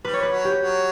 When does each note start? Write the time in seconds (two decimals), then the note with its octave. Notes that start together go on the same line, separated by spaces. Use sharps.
0.04 G3 B4
0.13 C#5
0.23 B4
0.31 F#3
0.45 G4
0.59 F#3